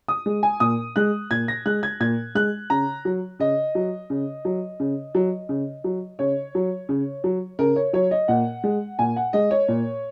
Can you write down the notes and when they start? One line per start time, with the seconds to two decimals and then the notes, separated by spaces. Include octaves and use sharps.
0.08 D#6
0.26 G#3
0.43 G#5
0.60 A#2 D#6
0.96 G#3 F#6
1.31 A#2 G#6
1.48 A#6
1.66 G#3 F#6
1.83 G#6
2.00 A#2 G#6
2.35 G#3 F#6
2.70 C#3 A#5
3.05 F#3
3.39 C#3 D#5
3.75 F#3
4.10 C#3
4.45 F#3
4.80 C#3
5.15 F#3
5.49 C#3
5.84 F#3
6.19 C#3 C#5
6.55 F#3
6.89 C#3
7.24 F#3
7.59 C#3 A#4
7.76 C#5
7.93 F#3 C#5
8.11 D#5
8.28 A#2 F#5
8.64 G#3
8.99 A#2 G#5
9.16 F#5
9.33 G#3 D#5
9.51 C#5
9.68 A#2